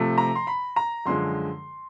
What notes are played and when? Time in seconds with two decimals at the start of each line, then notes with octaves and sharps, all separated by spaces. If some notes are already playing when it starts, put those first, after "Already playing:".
Already playing: C3 F3 A3
0.18 A#5
0.35 C6
0.47 B5
0.76 A#5
1.06 F#2 D3 F3 G#3 C6